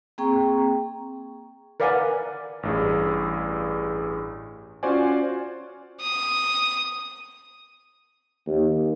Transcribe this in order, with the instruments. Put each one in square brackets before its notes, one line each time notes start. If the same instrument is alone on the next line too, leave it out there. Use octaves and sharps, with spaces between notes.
[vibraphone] A#3 C4 G#4 G5 A#5 C#6
[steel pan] A#4 B4 D5 F5 F#5 G#5
[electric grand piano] A1 G2 G#4
C#4 F4 F#4 C5 D5 G#5
[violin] D#6
[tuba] D#2